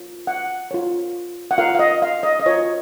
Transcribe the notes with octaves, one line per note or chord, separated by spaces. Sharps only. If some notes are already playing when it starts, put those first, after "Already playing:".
Already playing: F4 A#4 C#5
F#5
F4 A#4 C#5
F#5
F4 A#4 C#5 F5
F5
D#5
F5
D#5
D#5
F4 A#4 C#5